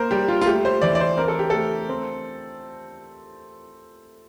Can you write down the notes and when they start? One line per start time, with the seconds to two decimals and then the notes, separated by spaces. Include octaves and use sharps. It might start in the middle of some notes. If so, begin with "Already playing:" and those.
Already playing: A#3 A#4 C5
0.11 G3 G4
0.28 F4
0.41 F4
0.46 A3 G4
0.65 C5
0.81 E3 D5
0.95 D5
1.00 C5
1.17 C4 A#4
1.28 A4
1.39 G4
1.50 A3 A4
1.89 C4